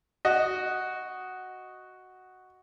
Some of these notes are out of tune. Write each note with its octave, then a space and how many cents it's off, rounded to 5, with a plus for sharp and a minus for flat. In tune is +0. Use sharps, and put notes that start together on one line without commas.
F#4 +0 D#5 +0